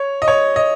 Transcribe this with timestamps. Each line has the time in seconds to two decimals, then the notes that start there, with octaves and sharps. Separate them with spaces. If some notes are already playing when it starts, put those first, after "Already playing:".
Already playing: C#5
0.22 D#5
0.28 C#5
0.56 D#5